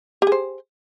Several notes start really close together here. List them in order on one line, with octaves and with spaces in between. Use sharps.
G4 G#4 C5